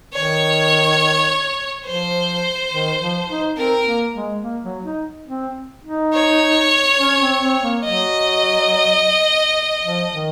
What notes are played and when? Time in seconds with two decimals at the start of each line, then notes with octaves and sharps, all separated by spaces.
0.14 D#3 C#5
1.85 F3 C5
2.71 D#3
3.00 F3
3.28 D#4
3.56 C4 A#4
3.85 A#3
4.13 G#3
4.42 A#3
4.63 F#3
4.84 D#4
5.27 C4
5.85 D#4
6.14 C#5
6.99 C#4
7.20 C4
7.41 C4
7.62 A#3
7.84 F#3 D#5
9.84 F3
10.12 D#3